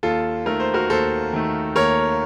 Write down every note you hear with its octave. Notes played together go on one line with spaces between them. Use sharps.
D#2 F4 A4
D#3 A3 A#4
C5
F#4 A#4
D#2 A4 C5
D#3 A3
D#2 A#4 C#5